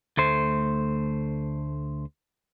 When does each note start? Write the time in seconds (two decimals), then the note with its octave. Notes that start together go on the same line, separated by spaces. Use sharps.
0.17 D2 A3 C5